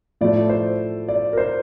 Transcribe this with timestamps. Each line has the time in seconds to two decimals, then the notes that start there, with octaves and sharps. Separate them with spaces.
0.21 A2 F3 A3 D5
0.50 C5
1.08 D5
1.33 A#4
1.38 C5